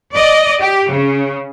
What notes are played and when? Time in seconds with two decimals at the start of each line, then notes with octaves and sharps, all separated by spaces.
0.13 D5 D#5
0.60 G4
0.90 C#3